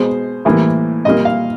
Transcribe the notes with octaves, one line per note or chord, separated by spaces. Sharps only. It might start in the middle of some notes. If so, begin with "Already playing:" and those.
Already playing: B2 G#3 C5
A2 E3 G3 A#3
A#2 G3 A#3 D#5
F5